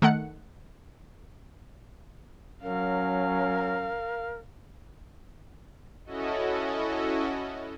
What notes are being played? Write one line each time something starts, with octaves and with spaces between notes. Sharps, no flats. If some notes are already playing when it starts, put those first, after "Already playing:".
D#3 A3 F#5 C#7
F#3 C#4 A#4 F5
C#4 E4 F#4 A4 D#5